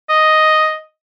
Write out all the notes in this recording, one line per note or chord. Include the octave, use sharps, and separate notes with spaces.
D#5